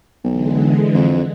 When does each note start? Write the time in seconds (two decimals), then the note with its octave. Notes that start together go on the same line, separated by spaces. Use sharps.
0.24 B1 D3 E3 G#3
0.94 F2